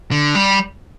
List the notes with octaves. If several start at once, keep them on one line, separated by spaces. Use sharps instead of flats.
D3
G3